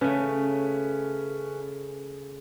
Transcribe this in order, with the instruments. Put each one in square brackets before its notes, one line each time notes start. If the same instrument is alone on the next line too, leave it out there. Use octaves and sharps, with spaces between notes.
[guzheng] C#3 A3 [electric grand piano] C#4 B4